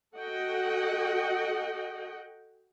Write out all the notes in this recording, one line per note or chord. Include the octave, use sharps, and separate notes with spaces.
F#4 A4 D#5 F#5 G5